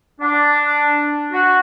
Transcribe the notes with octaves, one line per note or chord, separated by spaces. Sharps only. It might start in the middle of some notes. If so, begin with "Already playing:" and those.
D4
F#4